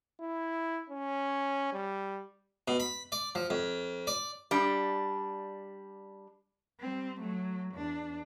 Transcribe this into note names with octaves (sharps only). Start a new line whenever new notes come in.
E4
C#4
G3
B2
B5
D5
F3
F2
D5
G3 D4
G3 C4
F#3 A3
E2 D4